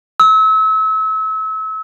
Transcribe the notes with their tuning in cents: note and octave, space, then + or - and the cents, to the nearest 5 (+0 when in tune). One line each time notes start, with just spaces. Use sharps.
E6 -35